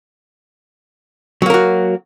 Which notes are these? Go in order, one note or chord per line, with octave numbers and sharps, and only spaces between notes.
F#3 A#3 F#4 A#4